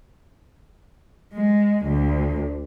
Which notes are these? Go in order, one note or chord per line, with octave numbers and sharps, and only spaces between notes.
G#3
D2